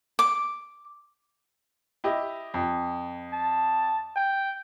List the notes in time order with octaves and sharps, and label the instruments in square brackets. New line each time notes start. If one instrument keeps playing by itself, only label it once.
[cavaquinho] D6
[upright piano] E4 G4 D#5
F2
[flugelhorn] A5
G5